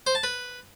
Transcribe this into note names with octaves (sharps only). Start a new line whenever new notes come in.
C5
A5
B4